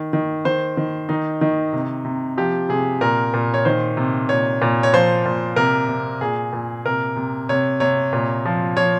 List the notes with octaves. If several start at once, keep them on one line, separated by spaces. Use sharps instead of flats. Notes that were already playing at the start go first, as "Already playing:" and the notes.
Already playing: D#3
D#3
D#3 C5
D#3
D#3 D#4
D#3
C3
C3
F3 G4
C3 G#4
A#2 A#4
A#2
C#5
D#3 C5
C3
A#2 C#5
A#2
C#5
F3 C5
A#2
C3 A#4
C3
A#2 G#4
A#2
C3 A#4
C3
C3 C#5
C3 C#5
A#2
F3
F3 C#5